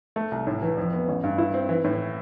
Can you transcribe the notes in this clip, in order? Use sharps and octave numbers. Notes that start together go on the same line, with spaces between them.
A3
C2
A2
E3
F2
B3
A1
G2
E4
C4
E3
A2